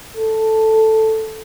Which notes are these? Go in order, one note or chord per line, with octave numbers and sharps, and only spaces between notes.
A4